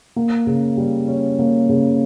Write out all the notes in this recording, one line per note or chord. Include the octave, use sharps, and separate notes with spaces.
A#3
C#3
G3
C#4
A#3
C#3